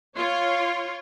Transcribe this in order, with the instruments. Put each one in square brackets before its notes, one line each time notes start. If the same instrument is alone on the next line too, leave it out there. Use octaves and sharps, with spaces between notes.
[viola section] F4 C#5